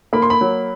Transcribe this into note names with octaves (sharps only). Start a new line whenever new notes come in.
A#3 B5
C6
B5
F#3